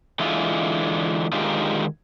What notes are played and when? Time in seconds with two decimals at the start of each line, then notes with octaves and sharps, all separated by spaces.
0.19 D3 E3 G#3 F4
1.33 D3 D#3 G#3 D#4 F4 G4